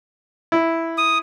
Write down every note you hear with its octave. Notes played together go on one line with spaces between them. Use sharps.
E4
D#6